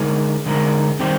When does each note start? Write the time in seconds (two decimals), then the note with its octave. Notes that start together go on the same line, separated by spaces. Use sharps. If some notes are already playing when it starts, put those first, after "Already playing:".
Already playing: D3 G#3 D#4 A#4
0.46 D3 G#3 D#4 A#4
0.99 D#3 G3 C4 G4